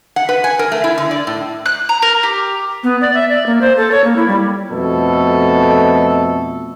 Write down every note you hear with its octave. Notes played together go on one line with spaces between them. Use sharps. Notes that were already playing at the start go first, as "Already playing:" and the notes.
F#5
B4
G#5
A#4
A3
E4
D3
D5
A2
F#6
A#5
A#4
G4
B3
D5
E5
D5
A#3
C5
A4
C#5
A#3
E4
G3
F2 B2 A3 A4